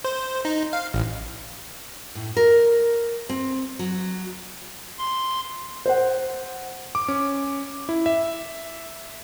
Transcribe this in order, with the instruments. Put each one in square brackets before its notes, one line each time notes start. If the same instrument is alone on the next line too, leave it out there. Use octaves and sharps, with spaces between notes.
[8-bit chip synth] C5
D#4
F5
A1
[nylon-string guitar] A2
A#4
C4
F#3
[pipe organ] C6
[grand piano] C5 F#5
[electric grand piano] D6
C#4
E4
E5